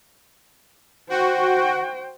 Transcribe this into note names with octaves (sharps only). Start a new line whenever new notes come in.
F#4 C5 G5